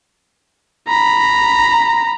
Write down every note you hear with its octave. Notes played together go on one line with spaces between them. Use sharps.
A#5 B5